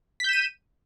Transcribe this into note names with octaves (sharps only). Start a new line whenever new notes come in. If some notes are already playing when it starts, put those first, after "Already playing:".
G6 B6 D#7 E7